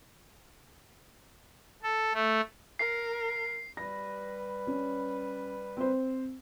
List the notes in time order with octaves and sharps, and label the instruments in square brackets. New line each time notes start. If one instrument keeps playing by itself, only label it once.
[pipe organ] A4
A3
[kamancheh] A#4 [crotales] C7
[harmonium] G3 B4 [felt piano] A#6
[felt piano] C#4
C4 C5